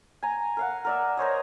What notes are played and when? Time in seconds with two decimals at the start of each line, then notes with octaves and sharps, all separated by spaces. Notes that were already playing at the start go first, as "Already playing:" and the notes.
0.23 G#5 A#5
0.57 A#4 F5 F#5
0.85 A#4 D5 E5
1.17 A#4 C5 C#5 D#5